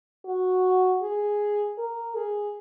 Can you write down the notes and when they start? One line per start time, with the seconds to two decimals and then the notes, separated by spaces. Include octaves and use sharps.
0.25 F#4
1.02 G#4
1.78 A#4
2.15 G#4